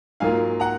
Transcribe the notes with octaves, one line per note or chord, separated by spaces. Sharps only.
G#2 F#3 A#3 F4 F5 G#5
F#5 A#5